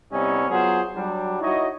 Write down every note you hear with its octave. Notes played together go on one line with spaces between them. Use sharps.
C3 G3 B3 C#4 D#4 E4
F#3 B3 F4 G#4 C5
F#3 G3 D4
D#4 E4 F#4 C#5 D#5